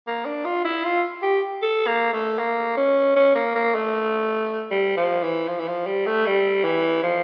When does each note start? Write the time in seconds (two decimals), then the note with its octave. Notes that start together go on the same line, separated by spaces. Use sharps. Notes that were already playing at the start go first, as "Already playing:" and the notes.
0.07 A#3
0.25 D4
0.45 F4
0.65 E4
0.85 F4
1.22 G4
1.62 A4
1.87 A#3
2.13 A3
2.38 A#3
2.77 C#4
3.16 C#4
3.35 A#3
3.55 A#3
3.75 A3
4.71 G3
4.97 F3
5.22 E3
5.48 F3
5.59 E3
5.68 F3
5.86 G3
6.06 A3
6.26 G3
6.64 E3
7.03 F3